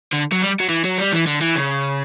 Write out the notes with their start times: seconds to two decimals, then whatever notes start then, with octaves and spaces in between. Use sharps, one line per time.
0.13 D3
0.32 F#3
0.42 G3
0.60 F#3
0.69 E3
0.85 F#3
0.98 G3
1.13 E3
1.26 D3
1.41 E3
1.55 C#3